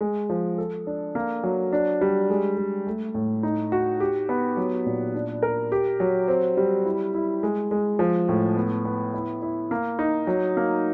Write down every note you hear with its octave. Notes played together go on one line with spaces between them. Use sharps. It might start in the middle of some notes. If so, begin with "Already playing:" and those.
G#3
F3
A4
D4
A#3
F#3
D4
G3
G#3
G#3
A3
A2
D#4
F#4
G4
B3
F#3
A#2
D4
A#4
G4
F#3
C4
G3
E4
E4
G#3
G#3
F3
A2
B3
B3
E4
E4
A#3
D#4
F#3
A#3